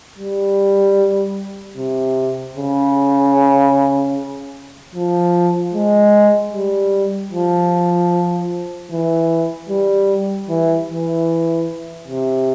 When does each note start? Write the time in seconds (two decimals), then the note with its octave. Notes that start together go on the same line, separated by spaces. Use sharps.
0.18 G3
1.77 C3
2.56 C#3
4.95 F3
5.74 G#3
6.53 G3
7.32 F3
8.91 E3
9.69 G3
10.49 E3
10.89 E3
12.07 C3